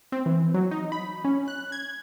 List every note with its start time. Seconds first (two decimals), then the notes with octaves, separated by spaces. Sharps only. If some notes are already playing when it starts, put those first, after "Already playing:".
0.12 C4
0.26 E3
0.54 F#3
0.71 D#4
0.92 B5
1.25 C#4
1.48 F#6
1.72 G#6